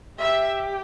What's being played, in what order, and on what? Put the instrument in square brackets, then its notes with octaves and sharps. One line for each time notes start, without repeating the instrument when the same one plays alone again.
[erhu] G4 [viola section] E5